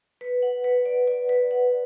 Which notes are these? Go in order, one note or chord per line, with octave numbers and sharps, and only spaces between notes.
B4
F#5
B4
D5
D5
B4
F#5